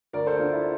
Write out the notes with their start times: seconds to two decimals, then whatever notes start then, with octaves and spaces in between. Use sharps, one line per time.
0.13 D2 A#4 D5
0.26 A4 C5
0.39 D3 D4 F4
0.53 E4